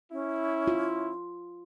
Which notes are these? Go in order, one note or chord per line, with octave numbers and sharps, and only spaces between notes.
C#4 E4
F4